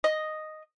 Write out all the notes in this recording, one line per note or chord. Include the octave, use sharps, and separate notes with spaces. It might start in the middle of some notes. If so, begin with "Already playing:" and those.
D#5